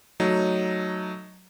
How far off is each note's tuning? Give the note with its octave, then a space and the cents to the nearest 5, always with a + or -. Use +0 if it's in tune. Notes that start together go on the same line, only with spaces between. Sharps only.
F#3 +0 A3 +0 D#4 +0